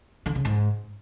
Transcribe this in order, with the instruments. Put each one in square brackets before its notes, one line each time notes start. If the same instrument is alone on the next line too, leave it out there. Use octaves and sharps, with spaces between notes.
[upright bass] D3
C#3
G#2